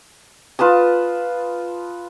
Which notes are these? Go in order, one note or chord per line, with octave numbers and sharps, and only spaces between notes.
F4 B4 A5 D#6